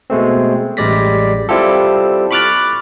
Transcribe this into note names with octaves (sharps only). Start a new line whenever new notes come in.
B2 G#3 A3 C4
A1 G3 G#3 D5 A#6 B6
G3 C4 E4 F4 G4 A4
B5 C#6 D6 F6 F#6 A6